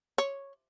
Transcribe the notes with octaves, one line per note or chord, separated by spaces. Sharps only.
C#5